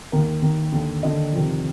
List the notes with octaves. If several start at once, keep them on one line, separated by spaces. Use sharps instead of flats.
D#2 D#3 A#4
D#2 D#3
D#2 D3
D#2 D3 D#5
F2 C3 D#3